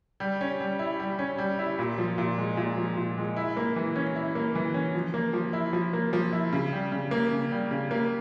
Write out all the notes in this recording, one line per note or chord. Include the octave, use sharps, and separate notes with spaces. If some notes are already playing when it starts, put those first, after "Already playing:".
G3
C#4
G3
E4
G3
C#4
G3
E4
A#2
F3
A#2
G#3
A#2
F3
A#2
G#3
E4
A#3
E3
C#4
E4
A#3
E3
C#4
F3
A#3
F3
E4
F3
A#3
F3
E4
C#3
G3
C#3
A#3
C#3
G3
C#3
A#3